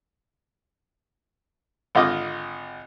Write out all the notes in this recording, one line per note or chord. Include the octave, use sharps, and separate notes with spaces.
G#1 D3 F4 D#5 D6 D#6